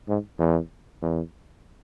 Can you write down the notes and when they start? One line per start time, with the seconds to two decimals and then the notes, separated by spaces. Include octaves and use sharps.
0.08 G#2
0.39 E2
1.02 E2